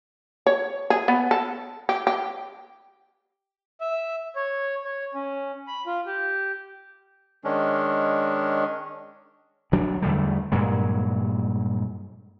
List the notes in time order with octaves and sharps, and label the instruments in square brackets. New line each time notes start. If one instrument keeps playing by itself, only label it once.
[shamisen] C#5
G#4
B3
A4
G4
G4
[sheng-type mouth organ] E5
C#5
C#5
C#4
B5
F4
G4
[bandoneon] D#3 G#3 C#4 D4
[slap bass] D2 F#3 D4
E2 D3 G3 A3
G2 A#2 F#3 G#3